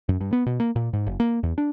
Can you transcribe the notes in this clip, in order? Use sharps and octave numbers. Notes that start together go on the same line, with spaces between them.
F#2
G2
B3
B2
A#3
A#2
G#2
F#1
A#3
E2
D4